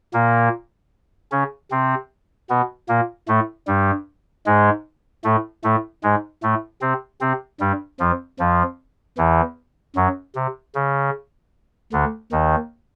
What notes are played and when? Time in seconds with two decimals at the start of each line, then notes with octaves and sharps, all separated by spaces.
0.14 A#2 A#3
1.32 C#3 C#4
1.71 C3 C4
2.50 B2 B3
2.89 A#2 A#3
3.28 A2 A3
3.67 G2 G3
4.46 G#2 G#3
5.24 A2 A3
5.64 A2 A3
6.03 G#2 G#3
6.43 A2 A3
6.82 C3 C4
7.21 C3 C4
7.60 G2 G3
8.00 F2 F3
8.39 F2 F3
9.18 E2 E3
9.96 F#2 F#3
10.35 C3
10.75 C#3
11.93 D2 D3
12.32 D#2 D#3